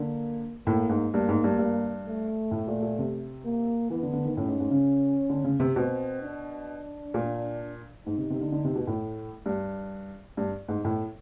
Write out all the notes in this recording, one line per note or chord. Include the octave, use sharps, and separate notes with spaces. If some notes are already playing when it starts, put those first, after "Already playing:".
Already playing: D3 A#3
A2 A#3
G#2
G2 A#3
G#2
G2
G2
A3
A2
A#2
A#2
C3
A#3
E3 B3
D3
D3
D#3
A2 C#4
G#2
G#2
C#3
D3
C#3
C3
B2 C4
D4
A#2
G#2 D#4
C3
C3
D3
D3
C3
B2
A2
G2
G2
G#2
A2